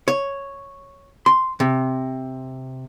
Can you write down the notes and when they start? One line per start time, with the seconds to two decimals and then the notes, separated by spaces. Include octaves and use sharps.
0.08 C#5
1.26 C6
1.60 C3